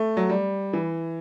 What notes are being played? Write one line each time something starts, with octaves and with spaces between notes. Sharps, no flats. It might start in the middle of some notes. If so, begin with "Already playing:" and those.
Already playing: A3
F#3
G3
E3